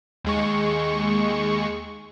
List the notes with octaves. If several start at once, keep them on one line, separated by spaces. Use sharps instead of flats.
D#2 G#3 C#6